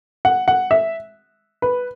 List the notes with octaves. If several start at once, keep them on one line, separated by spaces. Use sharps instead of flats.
F#5
F#5
E5
B4